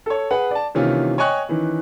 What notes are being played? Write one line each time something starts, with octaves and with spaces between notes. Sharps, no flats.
A4 C#5
G#4 B4 F#5
D5 A5
C3 D#3 E3 A#3 C#4 F4
C#5 D#5 G5 G#5 C#6 F#6
D#3 E3 C#4